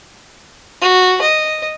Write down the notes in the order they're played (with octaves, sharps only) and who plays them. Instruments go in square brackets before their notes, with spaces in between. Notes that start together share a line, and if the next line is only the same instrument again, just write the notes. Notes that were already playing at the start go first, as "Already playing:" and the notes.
[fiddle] F#4
D#5